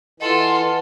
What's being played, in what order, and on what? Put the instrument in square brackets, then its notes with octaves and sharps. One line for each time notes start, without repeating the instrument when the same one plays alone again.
[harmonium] E3 [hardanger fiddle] F4 A4 [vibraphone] D#5 F#5 C6